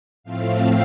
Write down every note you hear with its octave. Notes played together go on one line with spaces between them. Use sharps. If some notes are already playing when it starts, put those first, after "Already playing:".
A2 F3 A3 C4 F5